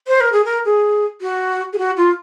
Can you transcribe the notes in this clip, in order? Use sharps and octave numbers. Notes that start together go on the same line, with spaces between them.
C5
A#4
G#4
A#4
G#4
F#4
G#4
F#4
F4